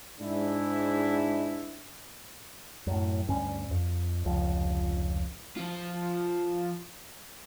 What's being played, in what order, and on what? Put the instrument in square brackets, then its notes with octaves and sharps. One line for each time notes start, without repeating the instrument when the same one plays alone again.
[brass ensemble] G#2 D4 E4
[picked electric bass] F#2 A2
D2 G2 C#4
F2
F1 C#2 F3
[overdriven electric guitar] F3 F4